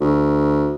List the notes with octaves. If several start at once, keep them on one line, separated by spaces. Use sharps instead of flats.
D2